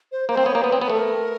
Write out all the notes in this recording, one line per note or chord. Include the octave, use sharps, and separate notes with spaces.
C5
A#3 C5
C4
B3 C#5
A#3
B3 B4
C4
B3 B4
A3 A4
A#4